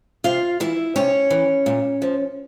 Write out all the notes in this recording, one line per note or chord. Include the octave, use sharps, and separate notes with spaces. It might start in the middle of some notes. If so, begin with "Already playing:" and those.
C3 F4 F5
E3 E4 E5
C3 C#4 C#5
E3
A#2
F3